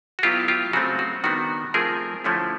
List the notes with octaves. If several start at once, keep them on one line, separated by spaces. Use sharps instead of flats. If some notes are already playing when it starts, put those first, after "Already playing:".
F#4
F#3 B3 E4 F4 G4
F4 G4
C#3 F#3 A3 C4 F#4
F#4
D#3 G3 B3 D4 F#4
F3 A3 C4 F4 G#4 A#4
D3 F3 A3 C#4 E4